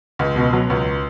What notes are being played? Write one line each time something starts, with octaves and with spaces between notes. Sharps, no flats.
C#2
B2
F#3
C#2